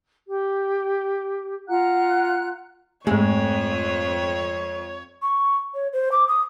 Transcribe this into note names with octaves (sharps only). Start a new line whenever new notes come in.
G4
F4 F#5 A#5 F#6
F2 G#2 G#3 A3 C#5
C#6
C#5
C5
D6
D#6